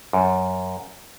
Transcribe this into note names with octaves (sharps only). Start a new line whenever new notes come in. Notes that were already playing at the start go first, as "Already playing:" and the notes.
F#2